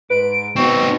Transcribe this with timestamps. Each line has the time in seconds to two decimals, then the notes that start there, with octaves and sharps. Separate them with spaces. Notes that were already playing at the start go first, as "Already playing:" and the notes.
0.10 G#2 B4 D7
0.56 B2 B3 C4 D#4 G5 C#6